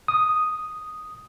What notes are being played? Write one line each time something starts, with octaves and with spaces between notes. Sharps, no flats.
D#6